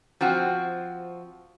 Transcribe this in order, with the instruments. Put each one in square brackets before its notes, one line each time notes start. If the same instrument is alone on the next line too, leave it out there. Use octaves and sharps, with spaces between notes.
[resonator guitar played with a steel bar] F3 C4 F#4